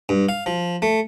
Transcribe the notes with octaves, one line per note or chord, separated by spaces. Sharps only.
G2
F5
F3
A3